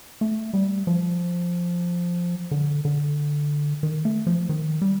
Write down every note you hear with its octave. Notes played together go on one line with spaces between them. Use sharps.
A3
G3
F3
D3
D3
D#3
A3
F3
D#3
G3